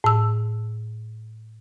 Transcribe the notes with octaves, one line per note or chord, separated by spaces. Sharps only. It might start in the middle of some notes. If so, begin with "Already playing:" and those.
A2 E6